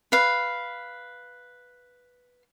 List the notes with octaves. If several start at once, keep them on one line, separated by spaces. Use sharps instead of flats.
B4 F5